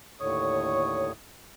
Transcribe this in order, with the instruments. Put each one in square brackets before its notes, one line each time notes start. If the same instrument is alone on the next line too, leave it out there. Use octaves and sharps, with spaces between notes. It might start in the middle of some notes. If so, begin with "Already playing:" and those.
[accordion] D#2 A2 D3 C#5 C#6 D#6